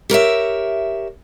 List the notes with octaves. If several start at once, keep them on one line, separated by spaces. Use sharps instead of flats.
G4 A#4 C#5 E5